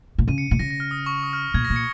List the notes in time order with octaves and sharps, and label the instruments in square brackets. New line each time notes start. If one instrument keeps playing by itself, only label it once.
[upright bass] A#2
[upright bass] C#3 [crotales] D#7
[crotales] C#7
[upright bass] A#2
[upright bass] C#3 [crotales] A#6
[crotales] A#6
F6
D#6
C#6
D#6
F6
[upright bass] A#2 [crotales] G#6
[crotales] A#6
[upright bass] A#2
[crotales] C#7